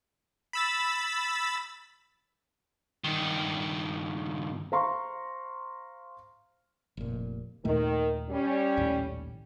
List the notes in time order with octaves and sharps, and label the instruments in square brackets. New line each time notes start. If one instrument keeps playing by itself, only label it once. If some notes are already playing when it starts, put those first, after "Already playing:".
[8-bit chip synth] B5 E6 A6
[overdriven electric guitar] G2 D#3
[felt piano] C5 F5 A#5 C6 C#6
[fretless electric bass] F1 A#2
[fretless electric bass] D#2 A#2 A3 [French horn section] D#3
[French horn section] G3 C#4
[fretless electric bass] A#1 D#2 A2